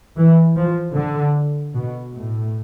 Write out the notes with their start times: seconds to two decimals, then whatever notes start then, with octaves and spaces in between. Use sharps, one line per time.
0.17 E3
0.56 F3
0.95 D3
1.74 B2
2.13 A2